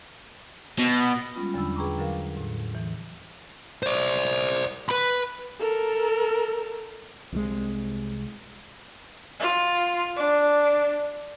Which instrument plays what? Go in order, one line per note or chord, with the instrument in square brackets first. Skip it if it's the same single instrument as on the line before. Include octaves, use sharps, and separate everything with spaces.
[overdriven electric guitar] B2
[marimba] G3 G#3 C#4 F4 B5
E2 D3 F#3 D4 B5 E6
G#4 B4 G5 A#5 C#6 D6
D3 F#3 A#4 F5
A2
E3
[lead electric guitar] C5 D5
B4 B5
[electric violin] A4 A#4
[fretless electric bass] C2 C3 E3 G#3
[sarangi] F4
D4